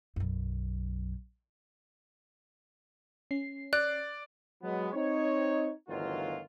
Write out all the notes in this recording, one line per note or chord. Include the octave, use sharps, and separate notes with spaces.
B1 F#2
C#4 C7
D5 F#6
F#3 G#3 B3
C4 D#4 C#5
G1 D2 D#3 E3 F#3 F4